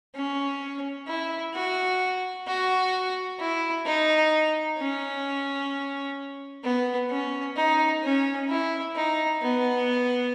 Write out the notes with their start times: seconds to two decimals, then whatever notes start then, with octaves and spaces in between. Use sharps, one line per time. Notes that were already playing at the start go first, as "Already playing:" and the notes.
0.15 C#4
1.07 E4
1.54 F#4
2.47 F#4
3.39 E4
3.85 D#4
4.78 C#4
6.64 B3
7.10 C#4
7.56 D#4
8.03 C#4
8.49 E4
8.95 D#4
9.42 B3